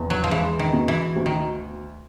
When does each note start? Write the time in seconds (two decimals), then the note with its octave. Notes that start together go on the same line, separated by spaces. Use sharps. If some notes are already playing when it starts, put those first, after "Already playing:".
Already playing: F1 E2
0.10 F#3
0.24 F3
0.31 E3 G#3
0.59 D#3
0.73 B2
0.88 E3
1.16 D2
1.26 D#3